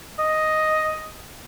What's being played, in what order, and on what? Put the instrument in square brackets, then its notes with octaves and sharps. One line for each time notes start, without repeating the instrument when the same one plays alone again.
[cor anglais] D#5